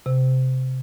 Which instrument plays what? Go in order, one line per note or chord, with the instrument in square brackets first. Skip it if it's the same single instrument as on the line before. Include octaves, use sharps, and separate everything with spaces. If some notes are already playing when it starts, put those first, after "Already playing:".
[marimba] C3